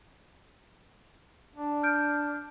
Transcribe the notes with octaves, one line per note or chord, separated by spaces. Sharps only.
D4
F6 G6 D7